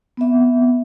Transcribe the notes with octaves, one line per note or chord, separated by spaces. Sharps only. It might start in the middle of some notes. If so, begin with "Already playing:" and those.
B3 C4 E5